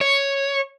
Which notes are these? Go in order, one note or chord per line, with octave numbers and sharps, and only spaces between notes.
C#5